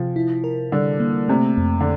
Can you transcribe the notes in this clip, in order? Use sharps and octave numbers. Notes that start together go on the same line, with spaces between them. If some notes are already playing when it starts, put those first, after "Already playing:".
Already playing: C3 F3
E4
A#4
D3 G3
A#3
C3 A3
F2
D3